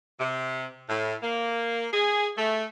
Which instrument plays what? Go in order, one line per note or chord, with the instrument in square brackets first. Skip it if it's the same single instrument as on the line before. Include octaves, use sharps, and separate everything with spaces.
[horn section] C3
A2
A#3
G#4
A3